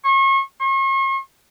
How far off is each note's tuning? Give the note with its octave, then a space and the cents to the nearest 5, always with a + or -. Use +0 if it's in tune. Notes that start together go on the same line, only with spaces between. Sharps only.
C#6 -35
C#6 -45